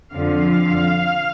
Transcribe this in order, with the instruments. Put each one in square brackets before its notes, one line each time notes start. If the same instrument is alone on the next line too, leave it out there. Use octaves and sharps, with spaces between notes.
[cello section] F2 D3 F3 F5